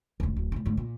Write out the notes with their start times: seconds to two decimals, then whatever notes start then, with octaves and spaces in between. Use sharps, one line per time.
0.20 D#1 D2
0.37 D1
0.52 A2 C#3
0.66 D2 G#2
0.77 A#2